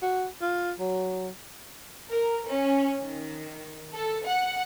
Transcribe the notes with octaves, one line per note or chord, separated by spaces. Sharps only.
F#4
F4
F#3
A#4
C#4
D#3
A4
F#5